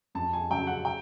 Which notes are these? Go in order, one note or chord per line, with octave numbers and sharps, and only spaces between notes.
F2 A5
G#5
C#3 F#3 G5
F#5
G5